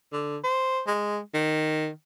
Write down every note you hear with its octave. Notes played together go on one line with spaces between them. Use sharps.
D3
C5
G#3
D#3